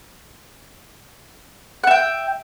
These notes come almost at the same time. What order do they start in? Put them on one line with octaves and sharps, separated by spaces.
F#5 E5 G5